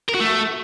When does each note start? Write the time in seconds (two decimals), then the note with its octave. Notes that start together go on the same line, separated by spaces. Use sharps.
0.09 A#4
0.14 F#4
0.20 A3